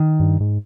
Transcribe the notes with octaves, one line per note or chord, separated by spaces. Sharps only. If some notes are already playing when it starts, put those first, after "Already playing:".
Already playing: D#3
G2
G#2